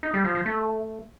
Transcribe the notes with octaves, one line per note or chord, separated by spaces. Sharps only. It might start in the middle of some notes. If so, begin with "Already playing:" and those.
D#4
G3
F3
F3
A3